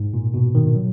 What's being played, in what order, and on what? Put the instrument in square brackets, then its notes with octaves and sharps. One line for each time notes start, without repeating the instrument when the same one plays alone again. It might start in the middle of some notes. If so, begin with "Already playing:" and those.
Already playing: [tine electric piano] G#2
A#2
B2
D#3
F#3